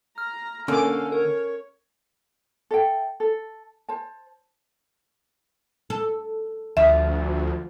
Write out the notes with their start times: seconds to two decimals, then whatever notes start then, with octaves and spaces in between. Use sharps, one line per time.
0.18 A#5 F6
0.68 D3 A#3 C#4 A4 F5 D6
1.12 A#4 C#5
2.71 A4 E5 G5
3.20 A4
3.89 C5 A5
5.90 A4
6.77 D2 F3 E5